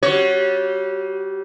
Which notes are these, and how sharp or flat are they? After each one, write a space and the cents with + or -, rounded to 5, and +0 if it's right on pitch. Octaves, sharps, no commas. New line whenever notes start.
G3 -20 F#4 +0 C#5 +0